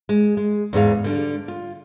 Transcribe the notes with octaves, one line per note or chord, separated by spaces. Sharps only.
G#3
G#3
E2 G#2 G#4 F5
D3 G3
F4